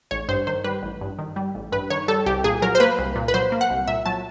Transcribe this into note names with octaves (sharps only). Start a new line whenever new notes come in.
A1 C#5
G2 C5
D#3 C5
G3 B4
A1
G2
D#3
G3
A1
G2 B4
D#3 C#5
G3 A4
C2 G4
A#2 G#4
F#3 A#4
C5
A#3 B4
C2
A#2
B4
F#3 C5
A#3
F#5
C2
A#2 E5
F#3 A5